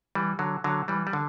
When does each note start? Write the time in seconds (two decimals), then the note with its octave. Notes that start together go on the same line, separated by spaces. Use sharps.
0.15 E3 G3
0.39 D3 F#3
0.64 D3 F#3
0.88 E3 G3
1.07 G3
1.13 D3